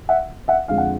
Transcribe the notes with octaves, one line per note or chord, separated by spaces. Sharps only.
E5 F#5
E5 F#5
F2 D3 F3 G#3 F5
F#5